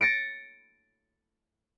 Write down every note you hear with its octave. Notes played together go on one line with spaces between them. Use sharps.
A6 A#6 C#7 D7